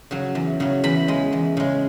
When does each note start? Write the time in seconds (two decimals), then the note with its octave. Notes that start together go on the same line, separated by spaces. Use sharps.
0.11 C#3 F#3
0.35 E2
0.60 C#3 F#3
0.84 E2 B5
1.08 C#3 G#3
1.33 E2
1.57 C#3 G#3